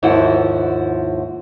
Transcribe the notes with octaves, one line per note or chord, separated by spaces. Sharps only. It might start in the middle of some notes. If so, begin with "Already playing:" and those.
D#2 G#2 F3 E4 F#4 F#5